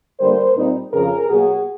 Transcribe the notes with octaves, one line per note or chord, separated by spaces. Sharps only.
D3 G3 A#3 A#4 C5
A#2 G3 C4 D#4
F2 C#3 F3 G#4 A#4
B2 F#3 A#3 F#4 G#4